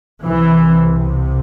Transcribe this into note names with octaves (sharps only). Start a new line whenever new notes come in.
C2 C3 E3